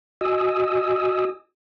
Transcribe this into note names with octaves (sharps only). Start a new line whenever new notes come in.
F#4 D#5 G#5 D#6 E6